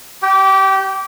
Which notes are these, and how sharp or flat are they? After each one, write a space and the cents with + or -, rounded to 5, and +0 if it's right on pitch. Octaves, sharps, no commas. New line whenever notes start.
G4 -25 G5 +0